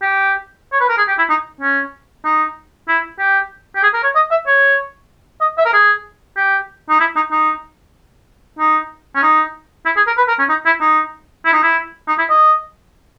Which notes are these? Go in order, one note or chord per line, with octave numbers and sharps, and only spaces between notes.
G4
C#5
B4
A#4
G#4
G4
E4
D#4
C#4
D#4
E4
G4
G4
G#4
A#4
C#5
D#5
E5
C#5
D#5
E5
A#4
G#4
G4
D#4
E4
D#4
D#4
D#4
C#4
D#4
E4
G#4
A#4
B4
A#4
C#4
D#4
E4
D#4
E4
D#4
E4
D#4
E4
D#5